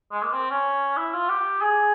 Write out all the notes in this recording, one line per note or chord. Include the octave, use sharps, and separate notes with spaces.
G#3
A#3
C4
C#4
E4
F4
G4
G#4